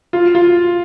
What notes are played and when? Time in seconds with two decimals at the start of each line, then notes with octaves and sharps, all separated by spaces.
0.13 F4
0.35 F4